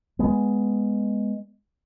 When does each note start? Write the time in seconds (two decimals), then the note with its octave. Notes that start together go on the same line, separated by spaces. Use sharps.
0.19 G#3 B3